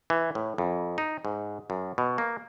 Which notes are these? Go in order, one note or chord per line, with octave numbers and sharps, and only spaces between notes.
E3
A2
F2
D#4
G#2
F#2
B2
A#3